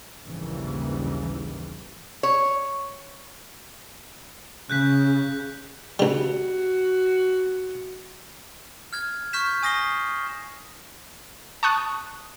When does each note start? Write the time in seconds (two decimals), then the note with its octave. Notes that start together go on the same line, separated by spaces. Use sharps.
0.23 A#1 D#2 G#2 C#3 E3 G3
2.23 C#5
4.70 C#3 F#6 G6 B6
5.99 C#2 G3 F#4
8.93 F6 G#6
9.33 C#6 F6 G6 B6 E7
9.63 G#5 D#6 A#6 C7 G7
11.63 A5 C#6 D#6 F#6